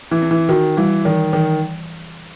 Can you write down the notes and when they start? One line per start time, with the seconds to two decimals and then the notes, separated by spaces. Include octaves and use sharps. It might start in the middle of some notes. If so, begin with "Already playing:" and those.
0.11 E3
0.22 C4
0.31 E3
0.49 D#3 F#4
0.77 E3 G3
1.05 D#3 E3
1.33 D#3 E3